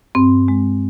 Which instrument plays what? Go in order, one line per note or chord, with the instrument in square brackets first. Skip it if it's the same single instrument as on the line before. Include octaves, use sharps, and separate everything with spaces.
[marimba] G2 C4
G#3